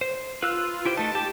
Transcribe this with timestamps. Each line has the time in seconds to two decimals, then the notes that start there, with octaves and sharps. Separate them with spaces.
0.01 C5
0.42 F4 B4 E6 F#6
0.85 E4 G4 C5
0.97 A3 D#4 A5
1.15 G4 A5